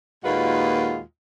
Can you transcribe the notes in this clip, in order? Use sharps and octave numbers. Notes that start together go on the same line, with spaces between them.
D#2 A#2 G#3 F4 F#4 B4